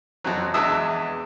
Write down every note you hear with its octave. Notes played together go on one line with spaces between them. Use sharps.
F2 C3 F#3
E2 G#3 D4 E5 D#6 E6